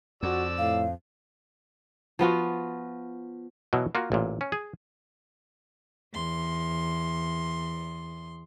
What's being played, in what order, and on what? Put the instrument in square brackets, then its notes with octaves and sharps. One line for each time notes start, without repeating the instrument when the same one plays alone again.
[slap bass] F2 [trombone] F#4 [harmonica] D5 E6
[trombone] A2 [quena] F5
[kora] F3 B3 F4 F#4
[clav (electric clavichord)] B2 E3 F#3
A#3 F4 F#4
A1 A#2
C#4
G#4
[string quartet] E2 C6